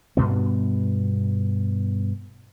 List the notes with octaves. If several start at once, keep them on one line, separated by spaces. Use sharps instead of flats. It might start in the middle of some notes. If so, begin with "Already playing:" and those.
G2 B2 B3